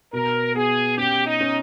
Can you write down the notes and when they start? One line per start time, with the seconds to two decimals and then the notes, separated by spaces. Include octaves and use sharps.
0.13 B2 A#4
0.55 B3 G#4
0.97 C#4 G4
1.26 D#4
1.41 C#4